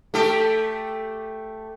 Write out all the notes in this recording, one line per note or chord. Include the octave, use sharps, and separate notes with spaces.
A3 G4 A4